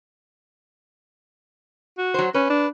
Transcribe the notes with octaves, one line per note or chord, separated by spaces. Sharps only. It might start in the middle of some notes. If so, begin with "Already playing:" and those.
F#4
F#3 C5
C#4 B4
D4